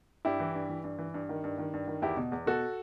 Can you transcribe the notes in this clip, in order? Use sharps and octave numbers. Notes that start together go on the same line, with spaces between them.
G2 E4 G4
E3
G2
E3
G2
E3
G2
D#3
G2
D#3
G2
D#3
E2 E4 G4
B2
E2
B2 F#4 A4